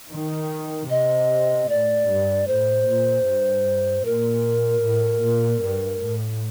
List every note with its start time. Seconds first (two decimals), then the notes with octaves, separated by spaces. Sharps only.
0.11 D#3
0.90 C3 D#5
1.69 A2 D5
2.08 G2
2.47 A2 C5
2.87 A#2
3.25 G2
4.05 A#2 A#4
4.83 A2
5.23 A#2
5.62 G2
6.01 A2